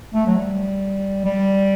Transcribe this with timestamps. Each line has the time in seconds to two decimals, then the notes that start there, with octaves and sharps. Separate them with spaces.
0.14 A3
0.27 F#3
0.37 G3
1.25 G3